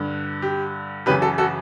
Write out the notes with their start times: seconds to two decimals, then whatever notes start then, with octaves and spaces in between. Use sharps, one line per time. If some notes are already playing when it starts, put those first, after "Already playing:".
Already playing: G2 D3
0.42 G4
1.06 F#2 C#3 E3 G4 B4
1.21 F#4 A4
1.38 F#4 A4